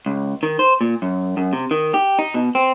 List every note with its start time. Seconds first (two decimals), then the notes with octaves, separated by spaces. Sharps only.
0.06 C#2
0.43 D#3
0.59 C5
0.81 A#2
1.02 F#2
1.37 F#2
1.53 C3
1.71 D#3
1.94 G4
2.19 D#4
2.34 B2
2.55 C4